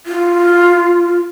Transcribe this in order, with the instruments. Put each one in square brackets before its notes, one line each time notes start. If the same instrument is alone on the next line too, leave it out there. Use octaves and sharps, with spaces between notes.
[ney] F4